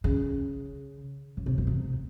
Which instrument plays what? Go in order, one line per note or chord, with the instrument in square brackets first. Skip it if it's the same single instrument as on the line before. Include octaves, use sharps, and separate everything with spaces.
[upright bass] C#3
C#3
C3
B2
C3